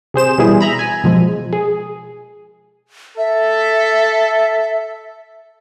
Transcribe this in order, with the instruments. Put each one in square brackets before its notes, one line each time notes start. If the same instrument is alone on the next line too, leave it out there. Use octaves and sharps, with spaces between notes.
[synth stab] C3 G#4 C5 E7
B2 E3 G3 E4 G#4
E5 A#5 B5
G#5
B2 F3 G#3
G#4
[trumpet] A4 [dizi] E5